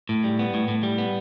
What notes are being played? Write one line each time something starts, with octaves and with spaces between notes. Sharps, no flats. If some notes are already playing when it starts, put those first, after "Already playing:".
A2
G3
B3
A2
A2
G3
B3